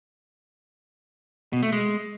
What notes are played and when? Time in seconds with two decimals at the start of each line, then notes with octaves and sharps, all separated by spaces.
1.53 B2
1.63 A3
1.72 G#3